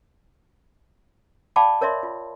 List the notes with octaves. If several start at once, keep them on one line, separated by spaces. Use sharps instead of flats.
D5 F5 G5 A5 B5 D6
A#4 C#5 D5 E5 C6
F4